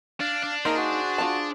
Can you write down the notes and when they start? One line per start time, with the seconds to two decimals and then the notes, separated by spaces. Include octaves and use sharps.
0.20 D4 F5
0.44 D4
0.65 A#3 D#4 G#4 A#4 C5
0.77 F#4
1.18 F4 A5